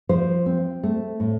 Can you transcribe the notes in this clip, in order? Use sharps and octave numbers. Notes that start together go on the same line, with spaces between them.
F3 C5
C4
A3
A2